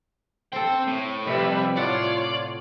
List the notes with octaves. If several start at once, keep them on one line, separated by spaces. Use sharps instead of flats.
C4 A4 C5 G5
A2
F2 C3 G3 B4 E5
A2 F4 C#5 D5 F#5 A5